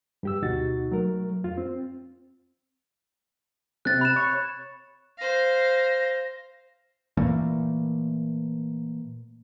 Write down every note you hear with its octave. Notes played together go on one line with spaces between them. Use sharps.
G2 G4 E6
D2 B2 D#4 F#4 A6
F#3 A3 A#4
F2 F4
C4
C3 F#6 A6
B5 F#6 E7
C#5
C5 F5 A#6
A#2 E3 A3 A#3